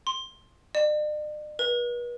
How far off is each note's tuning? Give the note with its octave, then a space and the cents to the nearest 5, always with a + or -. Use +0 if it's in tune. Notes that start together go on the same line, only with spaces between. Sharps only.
C6 +10
D5 +45
B4 -40